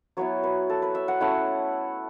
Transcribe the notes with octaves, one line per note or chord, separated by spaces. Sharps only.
F#3 B3 E4 C#5
B4
A4
B4
E5
F#5
A3 C#4 E4 F#5